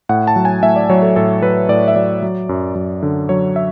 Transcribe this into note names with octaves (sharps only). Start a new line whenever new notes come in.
A2 F#5
A5
F#3
G#5
A2 E5
D5
F#3 C#5
A4
A2 A4
F#3 B4
A2 D5
E5
F#3 D5
F#3
F#2
F#2
D3
F#3 C#5
E5